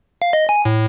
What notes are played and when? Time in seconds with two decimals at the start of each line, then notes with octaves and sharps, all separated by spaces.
0.22 F5
0.33 D#5
0.49 G#5
0.65 A2